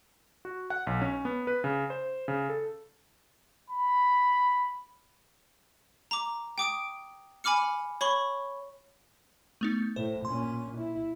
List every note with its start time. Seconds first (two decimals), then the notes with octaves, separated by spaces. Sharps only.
0.45 F#4
0.70 F#5
0.87 B1
1.02 C#4
1.25 B3
1.47 B4
1.64 C#3
1.90 C5
2.28 C#3
2.49 A4
3.71 B5
6.11 A#5 D6
6.58 G5 D6 D#6 D7
7.44 G#5 B5 D6 F6 C#7
8.01 C#5 B5 C#6 G7
9.61 A3 B3 D#4
9.96 A2 C5
10.25 A#2 C#4 C6
10.78 E4